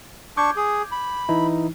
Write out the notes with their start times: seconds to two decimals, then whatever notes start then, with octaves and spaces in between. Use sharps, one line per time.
0.37 D4 C#6 D6 G6 G#6
0.56 G#4
0.92 B5
1.29 E3 D#4 E4